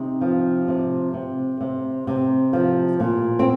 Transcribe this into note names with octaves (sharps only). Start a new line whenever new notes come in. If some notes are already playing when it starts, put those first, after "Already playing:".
Already playing: C3 C4 D#4
F3
C3
C3
C3
C3
F3
A#2
C4